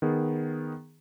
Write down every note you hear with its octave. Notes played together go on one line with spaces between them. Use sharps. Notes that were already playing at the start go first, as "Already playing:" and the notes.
D#3 B3 G#4